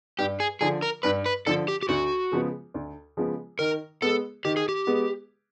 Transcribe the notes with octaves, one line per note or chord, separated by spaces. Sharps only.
G2 G4
G#4
D3 F3 G#4
A#4
G2 B4
B4
D3 F3 A4
G4
G4
D2 F#4
C#3 F3 G#3 B3
D2
C#3 F3 G#3 B3
D#3 A#4
G#3 B3 A4
D#3 G4
G#4
G4
G#3 B3